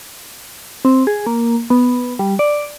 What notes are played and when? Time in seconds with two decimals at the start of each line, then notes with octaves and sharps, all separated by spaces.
0.85 C4
1.07 G#4
1.26 A#3
1.70 B3
2.19 G3
2.39 D5